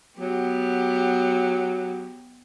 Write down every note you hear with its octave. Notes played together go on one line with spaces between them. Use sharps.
F#3 B3 G4